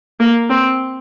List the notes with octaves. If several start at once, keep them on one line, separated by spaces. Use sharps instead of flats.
A#3
C4